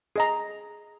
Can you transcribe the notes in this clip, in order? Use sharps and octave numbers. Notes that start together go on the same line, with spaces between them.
G#4 D#5 A#5